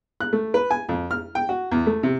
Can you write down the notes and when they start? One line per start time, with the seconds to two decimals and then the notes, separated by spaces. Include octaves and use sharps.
0.21 F#6
0.33 A3
0.54 B4
0.71 G#5
0.89 F2
1.11 F6
1.35 G5
1.49 F#4
1.72 E2
1.87 A3
2.03 C3